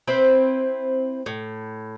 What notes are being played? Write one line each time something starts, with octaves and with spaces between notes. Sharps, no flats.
C4 E4 B4 C5
A2